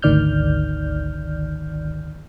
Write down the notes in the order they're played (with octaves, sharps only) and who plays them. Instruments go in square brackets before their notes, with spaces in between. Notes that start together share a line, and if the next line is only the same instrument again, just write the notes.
[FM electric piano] G#1 D2 D#3 D5 F6 G6